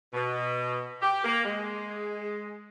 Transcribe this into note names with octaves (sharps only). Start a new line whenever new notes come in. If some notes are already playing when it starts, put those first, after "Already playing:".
B2
G4
A#3
G#3